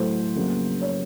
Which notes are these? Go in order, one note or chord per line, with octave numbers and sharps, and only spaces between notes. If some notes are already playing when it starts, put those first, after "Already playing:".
Already playing: A2 F#3 A3 C5
F2 C#3 F#3 A#3
C#5